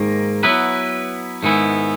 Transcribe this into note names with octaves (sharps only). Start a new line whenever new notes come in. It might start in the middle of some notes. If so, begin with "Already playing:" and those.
Already playing: G#2 D#3 A#3
F#3 B3 E4 B4
G#2 D#3 G#3 B3 E4